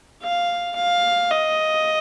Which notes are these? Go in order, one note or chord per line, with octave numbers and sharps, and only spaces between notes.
F5
F5
D#5